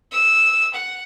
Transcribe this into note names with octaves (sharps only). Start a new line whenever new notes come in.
E6
F#5